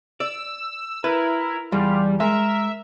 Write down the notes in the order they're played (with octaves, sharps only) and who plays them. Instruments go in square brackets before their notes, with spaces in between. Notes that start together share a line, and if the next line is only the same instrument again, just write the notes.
[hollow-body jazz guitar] D5 [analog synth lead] E6
[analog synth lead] E4 [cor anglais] A#4 [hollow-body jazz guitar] B4
[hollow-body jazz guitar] E2 [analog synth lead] G3 [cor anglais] F4
[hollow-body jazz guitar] G#3 [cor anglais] A#4 [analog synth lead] E5